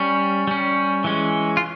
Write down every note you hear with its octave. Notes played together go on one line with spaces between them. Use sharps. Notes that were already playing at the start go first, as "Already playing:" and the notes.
Already playing: G3 C#4
G3 C#4
E3 G#3 C#4
F4